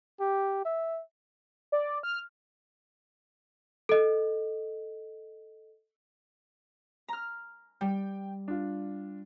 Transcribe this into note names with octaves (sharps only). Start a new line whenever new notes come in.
G4
E5
D5
F6
A4 D#5
A#5 F6
G3 G5
D4 F4